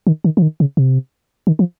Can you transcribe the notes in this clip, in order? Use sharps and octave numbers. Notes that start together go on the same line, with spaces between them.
D#3
D#3
F3
D#3
C#3
C3
D#3
F3